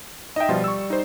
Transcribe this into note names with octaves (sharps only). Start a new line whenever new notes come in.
D#4 D#5 E5 G5
B2 F3 G3 F4
C#6 E6
D#4 C5